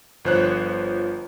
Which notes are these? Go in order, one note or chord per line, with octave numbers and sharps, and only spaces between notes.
G1 F3 C5 C#5 F#6